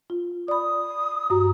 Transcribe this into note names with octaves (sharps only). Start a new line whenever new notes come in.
F4
D5 B5 D#6
G2 F#4 A#5